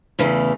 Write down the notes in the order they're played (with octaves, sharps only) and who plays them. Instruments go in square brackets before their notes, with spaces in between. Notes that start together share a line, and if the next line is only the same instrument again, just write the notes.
[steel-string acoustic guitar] E2 C#3 E3 A3